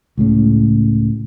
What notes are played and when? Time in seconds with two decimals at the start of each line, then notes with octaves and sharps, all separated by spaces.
0.17 C#2 A2 C#3